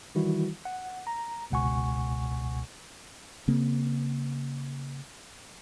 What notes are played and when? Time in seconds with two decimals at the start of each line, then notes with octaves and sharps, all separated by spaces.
0.15 D#3 E3 G3 E4 F#4
0.65 F#5
1.07 A#5
1.51 G1 C#2 B2 F#5 G#5 C#6
3.48 C#3 A#3 C4